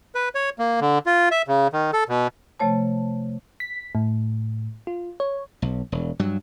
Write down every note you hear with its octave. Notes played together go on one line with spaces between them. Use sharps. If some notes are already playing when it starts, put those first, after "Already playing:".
B4
C#5
A#3
D3
F4
E5
C#3
D#3
A4
B2
C3 F3 A3 C#5 A5
B6
A2
F4
C#5
B1
E1
G2 F#3